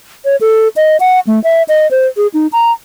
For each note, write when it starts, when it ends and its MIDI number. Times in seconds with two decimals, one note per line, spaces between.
0.25 0.36 73
0.41 0.68 69
0.76 0.97 75
1.00 1.20 78
1.27 1.42 57
1.44 1.63 76
1.69 1.89 75
1.91 2.07 72
2.17 2.27 68
2.34 2.47 63
2.53 2.72 82